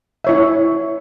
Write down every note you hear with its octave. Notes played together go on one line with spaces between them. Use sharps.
E4 C#5 E5